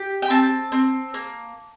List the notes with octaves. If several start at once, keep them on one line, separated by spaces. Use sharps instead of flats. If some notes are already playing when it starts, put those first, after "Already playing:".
Already playing: G4
G5
C4 A5
C4
A#3